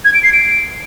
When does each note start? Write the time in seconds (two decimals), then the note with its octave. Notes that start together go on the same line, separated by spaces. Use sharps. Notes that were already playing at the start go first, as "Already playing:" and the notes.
0.05 G#6
0.14 D7
0.23 C7
0.33 D7